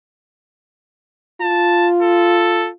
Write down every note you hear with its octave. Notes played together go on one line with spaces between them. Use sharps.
F4 A5
A4